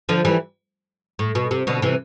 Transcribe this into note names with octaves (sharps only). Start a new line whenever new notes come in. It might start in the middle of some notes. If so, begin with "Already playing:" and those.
D3 F3
E3 G3
A2
B2
C3
B2 D3
C3 E3